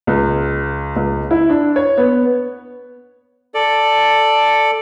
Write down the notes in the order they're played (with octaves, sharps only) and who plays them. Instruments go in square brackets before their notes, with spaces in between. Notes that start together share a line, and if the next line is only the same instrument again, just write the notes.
[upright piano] C#2
C#2
E4
D4
C#5
B3
[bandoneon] A4 D5